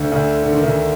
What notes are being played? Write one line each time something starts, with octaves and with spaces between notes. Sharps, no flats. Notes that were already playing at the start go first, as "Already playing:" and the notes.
Already playing: D2 D3
D2 D3
D3
D#3
D2 D3